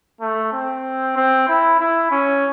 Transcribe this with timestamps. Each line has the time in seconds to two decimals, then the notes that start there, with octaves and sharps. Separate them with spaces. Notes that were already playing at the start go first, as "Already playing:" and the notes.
0.21 A3
0.53 C4
1.17 C4
1.48 E4
1.80 E4
2.11 C#4